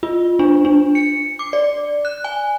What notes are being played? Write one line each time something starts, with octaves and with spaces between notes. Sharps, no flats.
F4
D4
D4
C#7
D6
D5
F#6
G#5